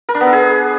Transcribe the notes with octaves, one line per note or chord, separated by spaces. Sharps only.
A#4
D4
B3
A4
G#4